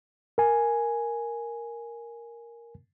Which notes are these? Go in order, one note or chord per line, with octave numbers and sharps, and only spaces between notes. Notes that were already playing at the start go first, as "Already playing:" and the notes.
A#4 G#5